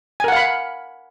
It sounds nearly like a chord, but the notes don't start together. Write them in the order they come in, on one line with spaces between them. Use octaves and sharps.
G#5 A#4 F#5 F5 B5